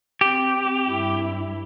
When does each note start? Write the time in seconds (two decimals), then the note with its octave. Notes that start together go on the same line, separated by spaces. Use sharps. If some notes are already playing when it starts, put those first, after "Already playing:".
0.21 C4 G4
0.87 G2 E4